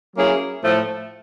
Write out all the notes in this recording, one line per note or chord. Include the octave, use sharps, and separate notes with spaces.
F#3 A#3 C#4 E4 G#4
A2 F3 A3